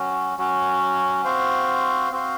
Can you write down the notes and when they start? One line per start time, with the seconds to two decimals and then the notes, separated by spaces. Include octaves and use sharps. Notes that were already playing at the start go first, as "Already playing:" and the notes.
Already playing: F#3 C#4 F#4
0.38 F#3 C#4 F#4
1.24 C4 F#4 C5 F5
2.11 C4 F#4 C5 F5